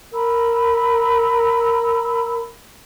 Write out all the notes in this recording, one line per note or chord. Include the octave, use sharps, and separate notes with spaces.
A#4 A#5 B5 E6